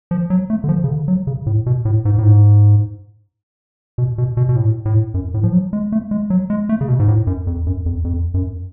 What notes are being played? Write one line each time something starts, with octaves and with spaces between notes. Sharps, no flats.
F3
F#3
A3
D3
F3
C#3
D3
F#3
C#3
A2
B2
A2
G#2
A2
G#2
B2
B2
B2
B2
A2
A2
F#2
A2
F3
F#3
G#3
A3
G#3
F#3
G#3
A3
C#3
B2
G#2
A2
F#2
F2
F#2
F2
F2
F#2